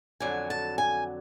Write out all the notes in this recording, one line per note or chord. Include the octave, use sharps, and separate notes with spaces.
F2 D3 F#3 G#5
A5
G#5